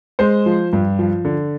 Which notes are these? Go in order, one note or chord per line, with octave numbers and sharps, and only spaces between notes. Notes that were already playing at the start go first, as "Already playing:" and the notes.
G#3 C5
F3
G2
F3
D3